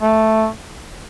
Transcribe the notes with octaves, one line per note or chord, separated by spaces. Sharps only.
A3